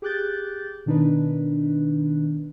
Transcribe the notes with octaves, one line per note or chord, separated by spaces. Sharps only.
G4 G#4 D6 F#6 G6 A6
B2 D#3 D4 D#4 B4